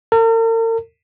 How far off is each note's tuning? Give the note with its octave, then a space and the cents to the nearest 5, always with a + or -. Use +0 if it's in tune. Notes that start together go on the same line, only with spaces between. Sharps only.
A#4 -45